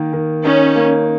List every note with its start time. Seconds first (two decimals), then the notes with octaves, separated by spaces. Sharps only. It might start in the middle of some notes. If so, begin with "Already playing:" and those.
Already playing: D#3 A#3
0.13 D#3
0.44 C#4 D#4
0.75 A#3